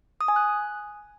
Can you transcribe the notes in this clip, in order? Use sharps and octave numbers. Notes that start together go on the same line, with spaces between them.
D#6
G#5
F#6